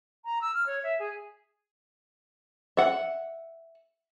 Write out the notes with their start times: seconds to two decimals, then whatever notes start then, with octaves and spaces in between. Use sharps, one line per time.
0.25 A#5
0.41 E6
0.54 F6
0.66 C#5
0.83 E5
0.99 G#4
2.77 E5 F#5